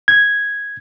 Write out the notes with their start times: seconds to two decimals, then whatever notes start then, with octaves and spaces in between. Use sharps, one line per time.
0.08 G#6